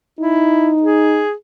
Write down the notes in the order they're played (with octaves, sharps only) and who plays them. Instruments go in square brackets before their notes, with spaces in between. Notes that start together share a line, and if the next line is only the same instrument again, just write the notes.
[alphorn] D#4 [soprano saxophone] E4
[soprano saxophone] G#4